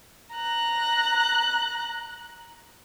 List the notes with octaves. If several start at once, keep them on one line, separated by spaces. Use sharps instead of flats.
A#5 F#6